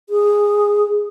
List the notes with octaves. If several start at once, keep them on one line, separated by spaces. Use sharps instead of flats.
G#4